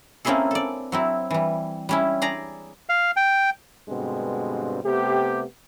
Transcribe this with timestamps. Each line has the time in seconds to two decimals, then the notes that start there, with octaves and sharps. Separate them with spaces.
0.25 A#3 C4 C#4 E4 G#4 A4
0.51 A4 D5
0.92 F#3 C4 E4
1.31 E3 G3
1.89 G3 C#4 E4
2.22 G#4 D5 A#5
2.89 F5
3.16 G5
3.88 G2 B2 D3 G#3 C4
4.83 C3 A3 B3 G4